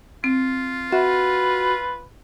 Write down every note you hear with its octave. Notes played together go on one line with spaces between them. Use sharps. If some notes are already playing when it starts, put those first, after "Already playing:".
C4 F4
F#4 B4 E5